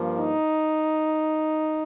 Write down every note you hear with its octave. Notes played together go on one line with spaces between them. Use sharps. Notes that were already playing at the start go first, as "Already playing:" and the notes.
Already playing: G2 F3 A#3
D#4